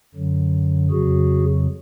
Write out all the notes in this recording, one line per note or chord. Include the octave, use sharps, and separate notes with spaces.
F#2 D3 F#3
F2 C#3 F#3 F#4 G#4